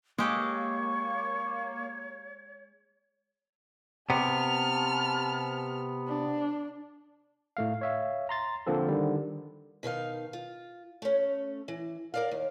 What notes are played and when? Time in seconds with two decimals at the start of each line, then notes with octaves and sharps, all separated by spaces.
0.18 G#3 A#3 G4 A4 C#5 C#6
4.10 C3 B3 A5 F6
6.08 D4
7.57 A2 A3 F5
7.81 C#5 E5 F5
8.29 A#5 C6 A6
8.67 D3 F3 A#3 C4 A4
8.88 D3 D#3 G3
9.83 B2 D#3 D#4 F5
10.33 F4
11.02 A3 C#4
11.68 E3
12.14 A#4 D5 F5
12.31 D#2